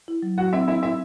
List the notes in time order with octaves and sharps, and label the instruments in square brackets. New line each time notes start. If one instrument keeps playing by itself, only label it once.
[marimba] E4
F#3
[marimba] F#3 [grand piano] F#4 F#5
[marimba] C4 [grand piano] E4 E5
[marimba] C4 [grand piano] E4 E5
[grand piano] E4 E5